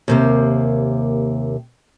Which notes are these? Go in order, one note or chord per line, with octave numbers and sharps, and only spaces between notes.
D#2 C3 A#3